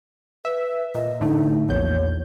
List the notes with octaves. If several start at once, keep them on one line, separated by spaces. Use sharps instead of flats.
B4 E5
A#2 D#5
A2 D3 A3 D#4
A#1 E2 C#5 G6